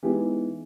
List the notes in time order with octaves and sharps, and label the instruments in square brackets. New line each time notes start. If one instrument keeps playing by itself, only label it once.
[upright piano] E3 G#3 B3 D#4 G4